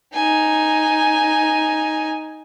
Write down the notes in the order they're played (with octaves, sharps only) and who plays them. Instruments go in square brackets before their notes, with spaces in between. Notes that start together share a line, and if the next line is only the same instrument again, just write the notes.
[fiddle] D#4 G#5